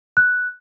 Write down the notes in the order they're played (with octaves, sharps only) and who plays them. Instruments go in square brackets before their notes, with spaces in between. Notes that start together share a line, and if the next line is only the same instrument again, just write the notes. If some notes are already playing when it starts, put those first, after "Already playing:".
[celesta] F#6